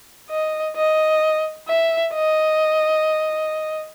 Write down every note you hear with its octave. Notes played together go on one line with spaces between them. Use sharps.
D#5
D#5
E5
D#5